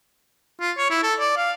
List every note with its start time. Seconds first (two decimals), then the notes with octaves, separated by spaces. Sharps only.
0.60 F4
0.77 C#5
0.90 E4
1.03 A4
1.19 D5
1.37 F5